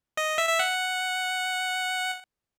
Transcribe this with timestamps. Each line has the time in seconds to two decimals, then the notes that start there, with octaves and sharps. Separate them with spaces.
0.17 D#5
0.38 E5
0.49 E5
0.59 F#5